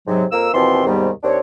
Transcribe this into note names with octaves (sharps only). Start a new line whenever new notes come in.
G#2 C3 F#3
F2 A#3 E6
D#2 B2 E3 F3 C4 C6
D#2 G#2 C3 D#3 G3 B3
D#2 C4 D4 C#5